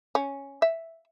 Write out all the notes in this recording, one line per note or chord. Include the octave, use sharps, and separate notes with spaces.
C#4
E5